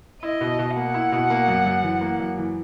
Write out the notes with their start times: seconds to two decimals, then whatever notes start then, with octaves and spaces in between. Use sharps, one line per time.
0.22 E4 D#5
0.41 B2
0.59 B2
0.76 A#3 F#5
0.94 E4
1.12 B2
1.30 A#3
1.48 F#2
1.66 F#2
1.83 E3
2.01 A#3
2.20 F#2
2.38 E3